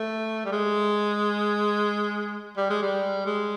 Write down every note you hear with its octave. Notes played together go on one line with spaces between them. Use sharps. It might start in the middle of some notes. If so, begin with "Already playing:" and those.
Already playing: A3
G3
G#3
G3
G#3
G3
G#3